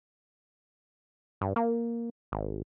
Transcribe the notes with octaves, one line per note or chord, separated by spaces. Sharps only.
G2
A#3
G#1